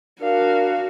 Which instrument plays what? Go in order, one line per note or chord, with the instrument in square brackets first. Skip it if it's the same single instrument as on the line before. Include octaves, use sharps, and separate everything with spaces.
[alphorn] D4 [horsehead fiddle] F#4 [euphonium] A#4 [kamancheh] F5